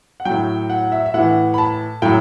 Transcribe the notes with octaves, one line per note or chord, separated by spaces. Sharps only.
F#5
A2 F#3 G5
F#5
E5
E5
A2 E3 F#5
B5
A5
A2 F#3 G5